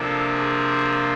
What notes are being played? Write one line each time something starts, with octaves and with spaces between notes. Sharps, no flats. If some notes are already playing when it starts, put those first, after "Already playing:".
Already playing: C3 F3 A#3 D4 A4
G#4